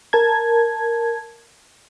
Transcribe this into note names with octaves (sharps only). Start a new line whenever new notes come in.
A#4 A5 G#6